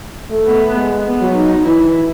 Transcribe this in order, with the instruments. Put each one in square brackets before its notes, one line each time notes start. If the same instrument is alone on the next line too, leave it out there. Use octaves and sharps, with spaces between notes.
[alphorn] A3
[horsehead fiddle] B3
[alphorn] G#3
[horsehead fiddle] B3
[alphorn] F#3
[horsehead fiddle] D#4
[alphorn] E3 [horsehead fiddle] E4